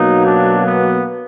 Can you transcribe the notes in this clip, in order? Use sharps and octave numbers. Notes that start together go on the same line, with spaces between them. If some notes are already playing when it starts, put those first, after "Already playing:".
Already playing: B2 F#3 A#3 D#4
D4
B3